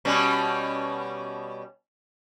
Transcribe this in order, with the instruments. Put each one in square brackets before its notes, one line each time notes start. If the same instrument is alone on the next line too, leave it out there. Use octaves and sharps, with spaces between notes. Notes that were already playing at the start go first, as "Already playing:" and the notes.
[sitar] B2 G3 C#4